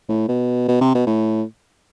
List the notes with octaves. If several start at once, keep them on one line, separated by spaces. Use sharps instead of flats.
A2
B2
B2
C3
B2
A2